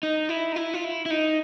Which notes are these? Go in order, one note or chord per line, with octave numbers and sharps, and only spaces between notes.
D#4
E4
D#4
E4
F4
E4
E4
D#4